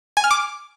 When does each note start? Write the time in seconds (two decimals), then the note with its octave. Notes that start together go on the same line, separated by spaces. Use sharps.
0.17 G#5
0.24 F6
0.31 D6